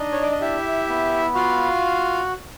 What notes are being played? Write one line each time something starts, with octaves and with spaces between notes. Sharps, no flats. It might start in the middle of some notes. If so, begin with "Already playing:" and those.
Already playing: D4 D#4 D#5
C#5
D5
D#5
E4 G4 E5
B3
F4 F#4 F5